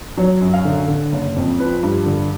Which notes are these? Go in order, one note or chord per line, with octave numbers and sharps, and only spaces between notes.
F#3 C#5
F#2
F5
D3
D3
F#1
F2
F3 B4
G2
D3